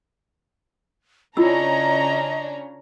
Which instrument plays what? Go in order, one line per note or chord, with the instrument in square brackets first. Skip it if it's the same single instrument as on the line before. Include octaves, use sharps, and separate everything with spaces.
[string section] C#3 C#4 D4 [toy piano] E4 F4 E6 [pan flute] D#5 [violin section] A#5